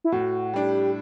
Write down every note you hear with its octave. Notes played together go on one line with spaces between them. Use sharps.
E4
A2 F#4
G3 D4 G4